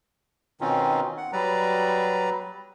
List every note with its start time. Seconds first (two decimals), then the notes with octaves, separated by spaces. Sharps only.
0.61 B2 D#3 C4 C#4 D#4 F4
1.17 F#5
1.33 F#3 G3 B4 D5 A#5